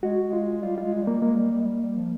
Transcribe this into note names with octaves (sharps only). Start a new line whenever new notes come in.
G#3 F#4
G#3
F4
G3 F4
F4
G#3
G3 A#3
G#3 A#3
G3
G3
G#3
G3
G3
F3